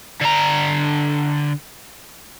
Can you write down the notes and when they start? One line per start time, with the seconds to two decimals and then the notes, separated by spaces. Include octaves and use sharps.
0.21 D3 A#5